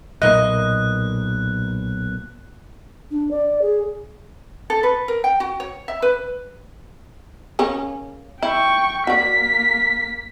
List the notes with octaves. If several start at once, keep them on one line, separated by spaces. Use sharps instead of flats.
B1 A#2 A#3 D#5 F#6
D4
D5
G#4
A4
B4
A#4
G5
F#4
C#5
E5
B4
C#3 A#3 C#4
E4 G5 C#6
A#3 F#4 D5 B6